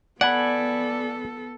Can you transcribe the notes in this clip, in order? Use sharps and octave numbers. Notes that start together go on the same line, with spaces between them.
B3 A4 D5 F#5 G#5 B5